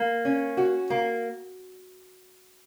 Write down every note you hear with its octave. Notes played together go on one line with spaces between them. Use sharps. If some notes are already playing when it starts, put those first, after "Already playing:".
Already playing: A#3
C#4
F#4
A#3